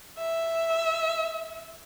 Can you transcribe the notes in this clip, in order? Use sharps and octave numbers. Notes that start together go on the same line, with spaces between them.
E5